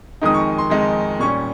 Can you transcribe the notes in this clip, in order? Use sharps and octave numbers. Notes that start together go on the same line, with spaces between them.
F2 D#3 G#3 D#4 D#6
C#6
C6
F2 D#3 G#3 D#4
A#2 G3 C#4 C#6